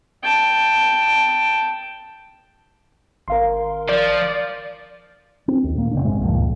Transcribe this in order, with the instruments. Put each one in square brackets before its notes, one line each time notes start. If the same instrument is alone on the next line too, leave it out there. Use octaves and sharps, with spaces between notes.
[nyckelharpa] G5 A5
[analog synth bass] G#1 [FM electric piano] A#4 F5 C6
[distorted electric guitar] F3 [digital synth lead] D5
[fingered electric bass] C4
D#2
A#2 A#3
F1 C2 C#3 D4
E2 G#2 C3 G#3
C#2 G2 A#2 F3